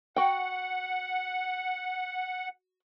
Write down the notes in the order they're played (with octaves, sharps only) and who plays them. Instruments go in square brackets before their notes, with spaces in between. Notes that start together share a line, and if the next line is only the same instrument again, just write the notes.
[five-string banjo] F#4 G5 [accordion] F#5